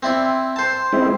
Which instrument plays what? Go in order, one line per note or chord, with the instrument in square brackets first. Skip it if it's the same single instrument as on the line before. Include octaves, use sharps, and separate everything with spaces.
[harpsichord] C4 E4 D5
C5 A5
[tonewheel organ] G#3 C4 E4